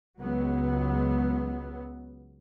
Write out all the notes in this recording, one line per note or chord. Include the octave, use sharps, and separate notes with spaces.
C#2 F#3 B3